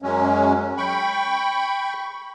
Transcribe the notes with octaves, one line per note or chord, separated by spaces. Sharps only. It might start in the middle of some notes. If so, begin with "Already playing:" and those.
F#2 F#3 G#3 C#4
G5 B5 C#6